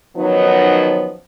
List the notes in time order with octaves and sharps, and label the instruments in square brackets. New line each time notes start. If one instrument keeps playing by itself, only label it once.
[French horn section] D#3 F3 F#3 B3 C#4 D#4